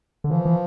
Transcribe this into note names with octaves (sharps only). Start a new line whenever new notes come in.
D3
E3 F3
E3